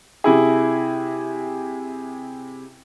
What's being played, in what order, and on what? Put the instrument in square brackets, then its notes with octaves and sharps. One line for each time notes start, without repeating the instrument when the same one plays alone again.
[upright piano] C3 E4 G#4